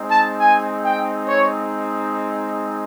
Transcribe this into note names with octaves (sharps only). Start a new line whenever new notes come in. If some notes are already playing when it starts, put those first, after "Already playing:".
Already playing: G#3 C4 D#4
A5
G#5
G5
C#5